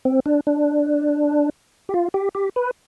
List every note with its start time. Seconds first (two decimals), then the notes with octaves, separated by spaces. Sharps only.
0.05 C4
0.26 D4
0.47 D4
1.89 G4
1.94 F4
2.14 G4
2.35 G4
2.56 B4